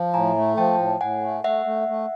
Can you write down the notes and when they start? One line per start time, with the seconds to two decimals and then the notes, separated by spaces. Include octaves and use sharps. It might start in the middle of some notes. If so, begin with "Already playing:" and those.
Already playing: F3
0.14 A2 G#5 A#5
0.36 A3
0.57 F3 G5 A5
0.79 A2
1.00 A2 F#5 G#5
1.23 A3
1.44 A3 E5 F#5
1.66 A3
1.88 A3